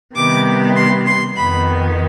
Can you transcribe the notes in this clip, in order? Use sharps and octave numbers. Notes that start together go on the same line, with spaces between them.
C3 D#3 G3 B3 D6
C6
C6
F2 D#3 B3 B5